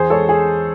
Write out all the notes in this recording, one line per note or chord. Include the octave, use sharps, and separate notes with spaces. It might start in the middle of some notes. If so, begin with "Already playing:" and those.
Already playing: E2 G#4 C5
G#3 A4 C#5
G#4